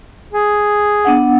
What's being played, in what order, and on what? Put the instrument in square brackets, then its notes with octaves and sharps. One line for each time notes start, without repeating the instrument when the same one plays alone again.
[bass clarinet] G#4
[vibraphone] B3 D4 F#5